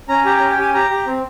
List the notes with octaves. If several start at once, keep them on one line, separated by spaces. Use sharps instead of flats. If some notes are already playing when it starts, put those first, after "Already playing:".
C#4 A#5
G4 A#5
A#5
C#4
G5
G4 G#5
G4 A#5
G4
C4